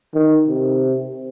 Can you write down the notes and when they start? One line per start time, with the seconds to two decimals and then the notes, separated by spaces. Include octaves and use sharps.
0.14 D#3
0.48 C3